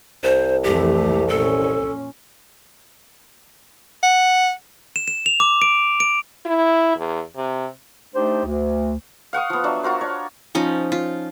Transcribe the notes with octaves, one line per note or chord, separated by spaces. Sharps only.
C2 C5
F2 E3 A3 G4
A#2 C#4 A4
F#5
E7
E7
F7
D6
D7
D7
E4
E2
C3
A3 D4 D#4 G4 C5
D2
F5 F#5 C#6 D#6
F3 B3
F#3 D4 E5
F4 F#4 A#4 C5
D4 C#5
F3 C#4 D#4
F4